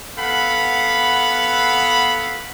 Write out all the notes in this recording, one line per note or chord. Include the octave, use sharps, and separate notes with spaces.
B3 A4 F5 F#5 B5